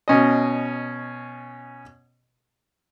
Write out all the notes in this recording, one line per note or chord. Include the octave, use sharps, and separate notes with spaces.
B2 C#4 D#5